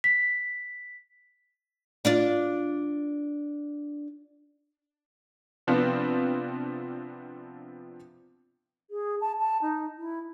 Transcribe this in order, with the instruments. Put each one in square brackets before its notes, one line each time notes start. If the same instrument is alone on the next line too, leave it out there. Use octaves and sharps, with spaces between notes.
[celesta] B6
[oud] D4 F4 D5
[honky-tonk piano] C3 F3 B3 C4 D4 F4
[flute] G#4
A5
A5
D#4
E4